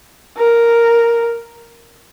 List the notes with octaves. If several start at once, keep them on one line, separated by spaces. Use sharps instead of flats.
A#4